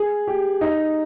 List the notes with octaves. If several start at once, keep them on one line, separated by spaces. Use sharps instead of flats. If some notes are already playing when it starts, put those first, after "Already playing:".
Already playing: G#4
G4
D#4